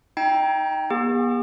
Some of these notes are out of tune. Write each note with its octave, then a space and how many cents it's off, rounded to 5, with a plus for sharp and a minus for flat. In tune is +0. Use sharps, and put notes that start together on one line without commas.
D#4 +0 G5 +0 A#5 +35
B3 -45 G#4 -45